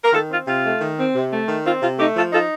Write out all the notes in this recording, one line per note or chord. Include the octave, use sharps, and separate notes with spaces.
A#4
D#3 F4 A4
C4 F4
C3 F4
A3
D#3
C4
C3
A3
D#3
C4 F4
C3 F4
A3 D#4 G4
F3 F4 A4
D#4 F4 A4